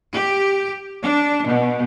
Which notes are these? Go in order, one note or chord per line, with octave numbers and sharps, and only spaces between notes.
G4
D4
B2